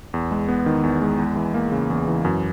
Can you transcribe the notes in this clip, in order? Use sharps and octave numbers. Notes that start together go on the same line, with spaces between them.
E2
G#3
B3
D#3
E2
G#3
E2
E3
A#3
C#3
E2
E3
F#2